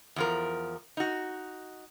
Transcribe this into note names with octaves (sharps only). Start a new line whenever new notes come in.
E2 F3 A#4
D#4 F#4